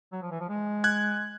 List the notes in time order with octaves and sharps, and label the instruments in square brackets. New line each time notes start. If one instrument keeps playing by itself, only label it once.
[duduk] F#3
F3
E3
F3
G#3
[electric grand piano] F#6 G#6